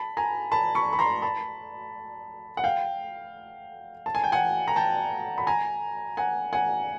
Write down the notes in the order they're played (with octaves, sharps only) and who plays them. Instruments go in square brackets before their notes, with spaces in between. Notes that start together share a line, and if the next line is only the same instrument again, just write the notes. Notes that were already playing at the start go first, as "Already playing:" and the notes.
Already playing: [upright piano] A5 B5
G#5 A#5
A5 B5
B5 C#6
B5
A#5 C6
A5 B5
F#5
F5 G5
A5
G#5
G5
F#5 G#5
A#5
G5 A5
B5
G#5 A#5
F#5 G#5
F#5 G#5